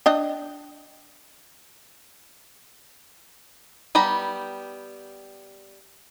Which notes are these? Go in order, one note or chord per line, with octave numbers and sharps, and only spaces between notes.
D4 D#5 G5
G3 B3 G4 A#5